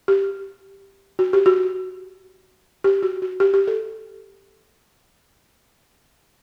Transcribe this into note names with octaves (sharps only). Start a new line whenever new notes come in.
G4
F#4
G4
F#4
G4
F#4
F#4
G4
G4
A4